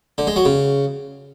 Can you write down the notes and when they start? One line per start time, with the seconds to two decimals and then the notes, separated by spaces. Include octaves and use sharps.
0.18 D3
0.27 G#3
0.36 F#3
0.45 C#3